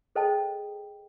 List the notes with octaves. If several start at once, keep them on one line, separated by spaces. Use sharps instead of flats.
G#4 A4 C5 D#5 G5 A5